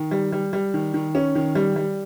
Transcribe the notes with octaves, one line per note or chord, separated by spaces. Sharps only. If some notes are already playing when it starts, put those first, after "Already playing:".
Already playing: D#3
G3
G3
G3
D#3
D#3
C#4
D#3
G3
G3